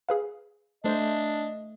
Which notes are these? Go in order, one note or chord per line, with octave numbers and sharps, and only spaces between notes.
G#4 B4 F5
A3 D4 C5 D#5